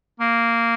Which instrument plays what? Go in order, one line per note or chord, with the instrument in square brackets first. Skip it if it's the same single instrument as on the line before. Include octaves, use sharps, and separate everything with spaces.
[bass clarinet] A#3